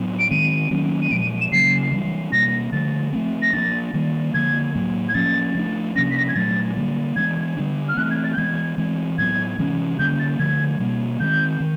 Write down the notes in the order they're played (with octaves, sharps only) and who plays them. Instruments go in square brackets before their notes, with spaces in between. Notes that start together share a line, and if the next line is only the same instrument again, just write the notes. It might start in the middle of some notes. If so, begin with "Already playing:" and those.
Already playing: [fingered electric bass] A2 F#3 B3 D4
[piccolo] D7
[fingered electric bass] D#3 G#3 C4 [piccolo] D#7
[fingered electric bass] D#3 F#3 A#3 C#4
[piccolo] D#7
[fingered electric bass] A#2 F3 G#3 [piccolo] D7
[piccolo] D#7
E7
[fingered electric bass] C#3 F#3 A#3 C#4 [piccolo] C7
[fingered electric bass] E3 G3 B3 D4
[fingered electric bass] B2 G3 A#3 [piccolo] A#6
[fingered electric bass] D3 F3 A3 [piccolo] A6
[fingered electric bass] F3 A3 C4
[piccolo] A#6
[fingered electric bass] F3 A#3 D4 [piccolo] A6
[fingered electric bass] D#3 G3 A#3
[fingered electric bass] D3 F3 A#3 [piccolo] G#6
[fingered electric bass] A2 F#3 A#3
[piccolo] G#6
[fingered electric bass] F3 A#3 C#4 [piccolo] A6
[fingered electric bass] F3 A3 D4
[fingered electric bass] C3 F3 A#3 C#4 [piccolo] A#6
[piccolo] B6
A#6
G#6
[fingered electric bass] A#2 F#3 A3 D4 [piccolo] A6
[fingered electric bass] D3 G3 A#3
[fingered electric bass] E3 G#3 B3 D4 [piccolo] G#6
[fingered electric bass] D3 G3 B3 D4
[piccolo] F6
[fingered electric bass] E3 A3 C4 [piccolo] F#6
[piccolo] G#6
A6
G6
[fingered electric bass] E3 G#3 B3 [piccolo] G#6
[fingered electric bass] E3 G#3 C4
[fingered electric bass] A2 F#3 B3 [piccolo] G#6
[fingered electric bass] C3 E3 G#3 C#4
[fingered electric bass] D3 G3 A#3 C#4 [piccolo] G6
[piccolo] A6
[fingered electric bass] D3 F3 A3 [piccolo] G#6
[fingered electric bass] B2 G3 A#3
[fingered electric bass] D#3 G#3 C4 [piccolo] G6
[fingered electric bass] D#3